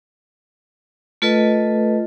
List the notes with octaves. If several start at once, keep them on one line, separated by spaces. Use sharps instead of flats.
A3 F4 A4 B4 D#5